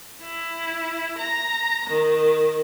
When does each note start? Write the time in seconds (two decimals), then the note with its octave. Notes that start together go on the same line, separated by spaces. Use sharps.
0.22 E4
1.18 A#5
1.90 D#3